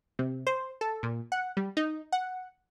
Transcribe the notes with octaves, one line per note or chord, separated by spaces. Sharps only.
C3
C5
A4
A#2
F#5
G3
D#4
F#5